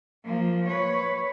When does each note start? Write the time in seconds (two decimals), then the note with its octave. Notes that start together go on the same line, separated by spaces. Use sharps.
0.25 F3 A#3
0.68 B4 C#5